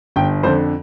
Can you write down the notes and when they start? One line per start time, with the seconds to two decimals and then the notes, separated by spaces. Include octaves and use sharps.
0.16 G1 G5
0.43 F2 D3 C5